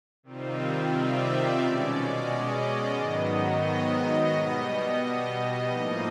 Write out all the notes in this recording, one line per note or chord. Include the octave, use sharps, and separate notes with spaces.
C3 D#3 G3 C4 F4
D5 E5
D5
B2 G#3 C#4 D5
D#5
G#2 D#3 F#3 B3
D#5
B2 G3 B3
A2 F3 A#3 D#4